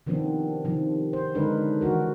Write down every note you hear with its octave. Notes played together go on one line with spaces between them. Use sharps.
C3 D#3 F3 B3 C4 D4
C3 D#3 F3
C5
D3 G#3 D4 D#4 A#4 B4
D#3 E3 F#4 A#4